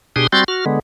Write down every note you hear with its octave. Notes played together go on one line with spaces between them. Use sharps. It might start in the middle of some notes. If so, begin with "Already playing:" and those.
B2 D4 G4 G#4 C6 D#6
G3 C4 F#4 C6 G6 A6
F#4 F6
D3 G#3 B3